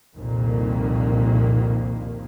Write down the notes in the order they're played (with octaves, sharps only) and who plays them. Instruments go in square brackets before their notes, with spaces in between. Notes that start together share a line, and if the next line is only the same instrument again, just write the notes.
[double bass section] C2 F2 A#2 D#3 A#3